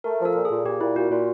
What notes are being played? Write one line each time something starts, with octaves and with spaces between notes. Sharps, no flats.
A3 A#4
F3 A4
A#2
G#4
A#2
A#2 G4
A#2 E4
A#2 F#4
A#2 F4